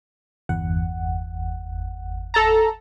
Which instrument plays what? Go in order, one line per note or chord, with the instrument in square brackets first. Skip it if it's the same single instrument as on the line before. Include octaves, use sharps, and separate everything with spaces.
[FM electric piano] G1 E2 F#5
[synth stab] A4 A5 A#5